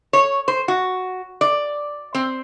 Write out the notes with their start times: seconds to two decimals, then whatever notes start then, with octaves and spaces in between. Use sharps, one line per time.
0.13 C#5
0.48 C5
0.68 F#4
1.41 D5
2.15 C4